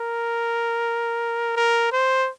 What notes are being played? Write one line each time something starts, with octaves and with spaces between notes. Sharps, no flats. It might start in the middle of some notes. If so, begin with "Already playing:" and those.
Already playing: A#4
A#4
C5